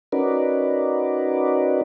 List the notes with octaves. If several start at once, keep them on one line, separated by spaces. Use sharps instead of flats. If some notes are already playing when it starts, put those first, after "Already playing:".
C#4 D#4 F#4 A#4 B4 D5